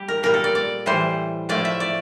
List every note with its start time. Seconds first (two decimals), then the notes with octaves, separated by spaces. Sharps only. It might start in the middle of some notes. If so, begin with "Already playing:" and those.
Already playing: G3 G4
0.08 A#4
0.23 A#2 G3 A#4
0.34 A4
0.44 D5
0.55 D5
0.86 A2 E3 G3 C5
1.49 A2 F3 A3 D5
1.65 E5
1.80 D5